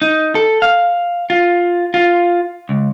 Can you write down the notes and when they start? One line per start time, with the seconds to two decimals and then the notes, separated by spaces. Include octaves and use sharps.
0.02 D#4
0.35 A4
0.62 F5
1.30 F4
1.94 F4
2.69 C#2